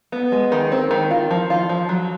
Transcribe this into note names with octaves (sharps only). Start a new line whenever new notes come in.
B3
G#3
D#3
C4
D#3
F4
F3
F4
F3
F#3